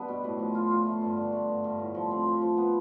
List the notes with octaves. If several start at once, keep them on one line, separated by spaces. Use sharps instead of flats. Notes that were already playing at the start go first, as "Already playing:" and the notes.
Already playing: G3 B3 D4
B2
A2
F3
F4
F4
A3
G2
D3
A3
G2
G2
A2
F3
C4
F3
F3
B3